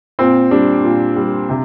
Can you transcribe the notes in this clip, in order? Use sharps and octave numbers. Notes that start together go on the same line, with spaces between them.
A#2 C4
G3 D4
A#2
G3
C3